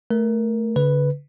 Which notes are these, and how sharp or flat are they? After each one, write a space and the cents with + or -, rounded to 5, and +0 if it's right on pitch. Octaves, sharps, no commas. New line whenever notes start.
A3 +0 A#4 +10
D3 -45 B4 +0